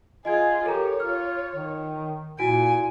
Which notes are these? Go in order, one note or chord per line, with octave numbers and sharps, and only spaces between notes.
F4 G#4 D#5 G#5 G#6
G4 A4 A#4 C#5 A#5
F4 F6
D#3
A#2 E4 F#4 G#5 D7